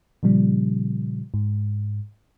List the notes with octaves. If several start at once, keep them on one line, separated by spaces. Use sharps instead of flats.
A#2 C#3 F3 G3
G#2